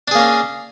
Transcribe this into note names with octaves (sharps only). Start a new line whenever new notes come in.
A#3 C#4 D4 G#4